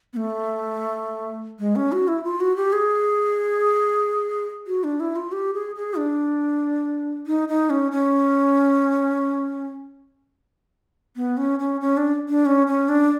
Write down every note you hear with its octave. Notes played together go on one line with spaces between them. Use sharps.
B3
A3
G#3
C#4
F#4
E4
F4
F#4
G4
G#4
F#4
D4
E4
F4
G4
G#4
G#4
D4
D#4
D#4
C#4
C#4
B3
C#4
C#4
C#4
D4
D4
C#4
C#4
D4